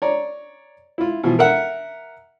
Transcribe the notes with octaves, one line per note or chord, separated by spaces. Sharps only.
C#5 D5 A#5
E4 F4
B2 E3 F3
A#4 E5 F#5